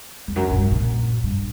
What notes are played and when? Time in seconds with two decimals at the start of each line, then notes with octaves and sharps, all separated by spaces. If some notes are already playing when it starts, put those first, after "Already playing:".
0.28 E2
0.36 F#2
0.51 A#2
0.58 G2
0.72 B2
0.80 A#2
1.23 G2